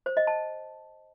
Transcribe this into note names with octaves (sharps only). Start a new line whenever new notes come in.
C5
D#5
A5